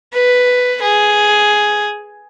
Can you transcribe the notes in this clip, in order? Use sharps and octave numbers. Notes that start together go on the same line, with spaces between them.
B4
G#4